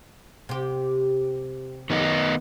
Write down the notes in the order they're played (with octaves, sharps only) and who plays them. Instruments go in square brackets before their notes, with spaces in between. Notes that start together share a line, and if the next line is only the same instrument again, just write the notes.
[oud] C3 G4
[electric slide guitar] D#3 B3 D#4